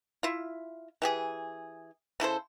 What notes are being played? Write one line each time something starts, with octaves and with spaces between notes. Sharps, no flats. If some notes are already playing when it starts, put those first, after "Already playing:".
E4 F4
E3 G4 G#4
C#3 E4 A4 C5